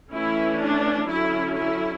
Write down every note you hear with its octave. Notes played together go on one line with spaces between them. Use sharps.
E3 A3 C#4 E4
D4
D3 F#3 C#4 E4
E4